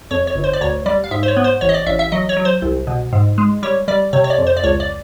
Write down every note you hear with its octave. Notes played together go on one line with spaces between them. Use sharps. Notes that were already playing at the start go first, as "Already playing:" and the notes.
F2 C#5
C#5
G1
C5
D5
D2 C#5
G3 D5
F5
G#2 E5
C5
C#5
B3
C5
A1 C#5
D#5
D5
A1 E5
E5
F#3 D#5
C#5
F#3
C5
C2
B2
G#2
G#3
G3 C#5
G3 D5
C3 C#5
C#5
D5
F2
C5
D5
C#2 C#5
D5